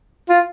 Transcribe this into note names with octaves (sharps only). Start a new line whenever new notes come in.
F4